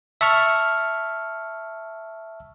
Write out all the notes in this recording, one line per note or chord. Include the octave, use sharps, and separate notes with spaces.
E5 A5 C#6 F6